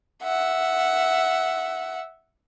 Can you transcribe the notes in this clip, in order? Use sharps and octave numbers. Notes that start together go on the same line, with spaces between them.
E5 F#5